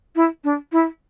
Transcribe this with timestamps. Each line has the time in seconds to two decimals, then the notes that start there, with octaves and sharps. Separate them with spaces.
0.16 E4
0.44 D4
0.72 E4